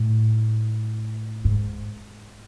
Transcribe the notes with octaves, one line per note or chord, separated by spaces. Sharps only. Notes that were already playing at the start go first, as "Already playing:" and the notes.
Already playing: A2
G#2